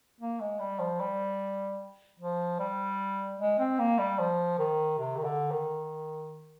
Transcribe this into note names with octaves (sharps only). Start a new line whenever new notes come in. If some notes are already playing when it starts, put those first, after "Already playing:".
A#3
G#3
G3
F3
G3
F3
G3
G#3
C4
A#3
G3
F3
D#3
C3
D#3
D3
D#3